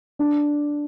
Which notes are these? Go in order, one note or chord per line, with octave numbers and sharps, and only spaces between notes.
D4